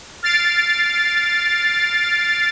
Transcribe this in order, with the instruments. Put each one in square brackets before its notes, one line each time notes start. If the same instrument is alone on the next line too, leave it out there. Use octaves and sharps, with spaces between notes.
[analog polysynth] F6 A6 C7 D7